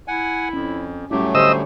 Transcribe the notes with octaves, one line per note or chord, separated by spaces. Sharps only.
E4 F#5 G#5
F2 C#4
A2 F#3 G3 A3 C#4 E4 G4
D3 G4 C5 C#5 D#5 E6